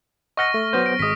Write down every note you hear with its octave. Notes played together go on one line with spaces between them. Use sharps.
D#5 F#5 C#6 F6 A#6
A3
F#3 B3 C5
D7
G#1 G#3 D#6 B6